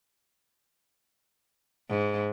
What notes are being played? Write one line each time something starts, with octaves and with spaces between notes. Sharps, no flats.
G#2